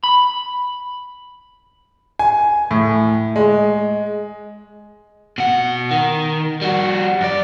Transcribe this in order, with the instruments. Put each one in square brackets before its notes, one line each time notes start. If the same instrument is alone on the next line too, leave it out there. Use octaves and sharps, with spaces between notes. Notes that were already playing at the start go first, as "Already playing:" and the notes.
[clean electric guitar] B5
[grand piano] G#5
A2
G#3
[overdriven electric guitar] B2 F#5
D#3
G3 F#4
F#2 D5